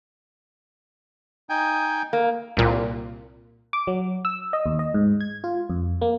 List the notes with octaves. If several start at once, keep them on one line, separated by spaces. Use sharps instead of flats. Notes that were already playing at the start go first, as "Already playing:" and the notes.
D#4 G5 G#5
A#3
C2 A#2
D6
F#3
E6
D#5
D#2
D#5
G#2
G#6
F4
F2
A#3